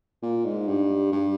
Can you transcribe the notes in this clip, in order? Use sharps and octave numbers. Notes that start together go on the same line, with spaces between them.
A#2
G#2
G2
G2